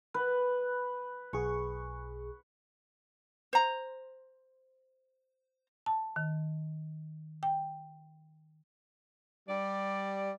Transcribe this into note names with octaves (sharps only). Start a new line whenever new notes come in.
B4
B1 G#4 C#6
C5 A#5
A5
D#3
G5
G3 D5